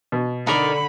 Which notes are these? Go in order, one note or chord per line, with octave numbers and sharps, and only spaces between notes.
B2
D3 D#4 A#4 D5 B5